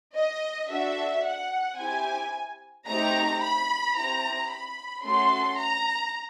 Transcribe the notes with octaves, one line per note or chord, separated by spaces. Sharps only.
D#5
D4 F#4 A4 E5
F#5
C4 E4 G4 G#5
A3 C4 D#4 G4 A#5
B5
C4 E4 G4 A#5
B5
A3 C#4 F#4 A4 C6
A#5